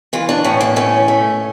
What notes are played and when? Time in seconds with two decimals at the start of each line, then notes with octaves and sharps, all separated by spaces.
0.13 E3 F4
0.29 D4
0.44 A2 C#4
0.61 A#3
0.76 A3 C#4
1.08 A3